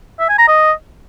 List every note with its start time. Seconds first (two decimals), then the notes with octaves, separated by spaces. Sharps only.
0.20 E5
0.29 G#5
0.38 A#5
0.48 D#5